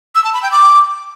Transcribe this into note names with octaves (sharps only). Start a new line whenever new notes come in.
E6
A5
B5
G5
D6